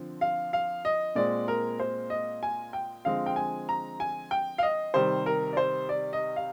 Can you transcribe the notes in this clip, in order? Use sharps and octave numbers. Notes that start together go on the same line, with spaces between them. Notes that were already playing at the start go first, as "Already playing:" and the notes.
Already playing: D3 F3 C4
F5
F5
D#5
A#2 G#3 C4 D5
A#4
C5
D#5
G#5
G5
D3 F3 G#3 C4 F5
G5
G#5
A#5
G#5
G5
F5
D#5
C3 D#3 G3 C5
A#4
D5
C5
D5
D#5
F5